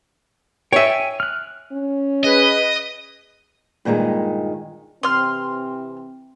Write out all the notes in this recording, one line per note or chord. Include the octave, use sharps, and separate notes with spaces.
C#5 E5 G5 G#5
F6 F#6
C#4
G#4 B4 D#5
G2 A#2 D#3 G#3 A#5
C3 E3 C4 C6 F6